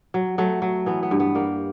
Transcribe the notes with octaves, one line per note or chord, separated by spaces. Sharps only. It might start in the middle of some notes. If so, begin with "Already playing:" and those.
F#3
F#3 A3
F#3
E3 B3
B3
G2
B3
G3 A#3